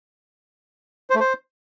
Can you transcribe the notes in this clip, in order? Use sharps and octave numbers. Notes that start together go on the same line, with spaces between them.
C5
A3
C5